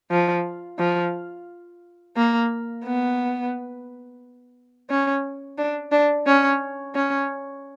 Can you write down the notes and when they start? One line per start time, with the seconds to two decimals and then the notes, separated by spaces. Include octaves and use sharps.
0.11 F3
0.79 F3
2.16 A#3
2.84 B3
4.89 C#4
5.58 D4
5.92 D4
6.26 C#4
6.95 C#4